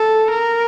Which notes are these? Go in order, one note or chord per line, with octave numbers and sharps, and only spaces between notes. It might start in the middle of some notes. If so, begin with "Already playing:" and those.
Already playing: A4
A#4